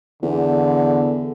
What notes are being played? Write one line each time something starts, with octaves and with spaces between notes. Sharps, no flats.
E2 D3